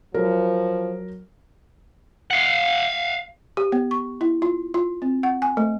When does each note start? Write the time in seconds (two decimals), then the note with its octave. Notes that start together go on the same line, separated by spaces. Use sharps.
0.14 F3 F#3 A#4
2.30 F5 F#5
3.57 G4
3.72 B3
3.91 C#6
4.21 E4
4.42 F4
4.74 F4
5.02 C4
5.23 F#5
5.42 G#5
5.57 A3